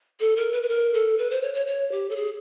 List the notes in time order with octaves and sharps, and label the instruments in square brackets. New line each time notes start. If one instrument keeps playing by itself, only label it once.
[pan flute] A4
A#4
B4
B4
A#4
A4
B4
C5
C#5
C#5
C#5
G4
A4
G#4